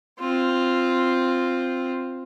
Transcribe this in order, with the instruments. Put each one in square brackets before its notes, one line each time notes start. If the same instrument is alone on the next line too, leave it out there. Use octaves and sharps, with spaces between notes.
[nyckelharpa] C4 F4